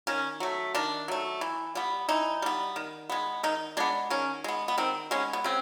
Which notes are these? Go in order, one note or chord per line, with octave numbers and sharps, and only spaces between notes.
D#3 C#4
F#3 A3
D#3 D4
F#3 A3
E3
G3 B3
E3 D#4
G3 B3
D#3
G#3 B3
D#3 D#4
G#3 B3 D4
D#3 C#4
G#3 B3
B3
D#3 C4
G#3 B3 C#4
B3
C#3 C4